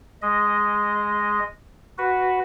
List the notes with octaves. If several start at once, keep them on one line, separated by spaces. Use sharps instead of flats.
G#3 D#5
F#4 B4